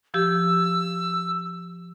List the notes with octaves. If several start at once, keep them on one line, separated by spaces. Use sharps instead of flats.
F3 G4 E6